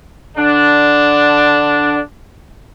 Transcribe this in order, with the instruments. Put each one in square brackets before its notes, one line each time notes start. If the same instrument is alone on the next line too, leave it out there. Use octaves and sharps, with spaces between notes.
[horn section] D3 D4